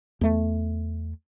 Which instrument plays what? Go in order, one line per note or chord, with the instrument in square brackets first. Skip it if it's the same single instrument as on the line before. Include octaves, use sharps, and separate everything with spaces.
[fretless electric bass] E2 A3